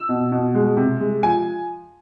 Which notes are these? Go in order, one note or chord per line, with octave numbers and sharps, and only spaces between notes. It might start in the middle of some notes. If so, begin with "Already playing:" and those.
Already playing: E6
B2
B2
G#3
C3
G#3
F3 G#5